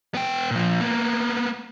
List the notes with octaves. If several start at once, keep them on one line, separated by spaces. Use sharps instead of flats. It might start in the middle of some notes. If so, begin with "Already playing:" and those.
B3 G5
A#2 F3
A#3 B3